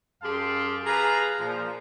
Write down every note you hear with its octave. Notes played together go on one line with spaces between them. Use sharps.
F#2 G4 G#4 F5 A5 C6
G#4 B4 F5 A5 A#5
A#2 F3